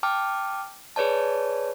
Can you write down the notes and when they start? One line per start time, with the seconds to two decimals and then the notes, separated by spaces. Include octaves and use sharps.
0.03 G5 A5 D6 F6
0.96 G#4 B4 C#5 D5 A5